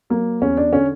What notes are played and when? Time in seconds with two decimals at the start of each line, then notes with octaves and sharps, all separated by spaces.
0.10 F#3 A#3
0.42 E2 C#4
0.57 D4
0.73 D3 C#4